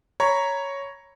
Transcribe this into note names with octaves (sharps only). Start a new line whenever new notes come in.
C#5 A#5 B5 C#6